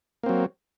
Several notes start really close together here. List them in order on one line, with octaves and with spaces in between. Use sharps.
A#3 C4 F#3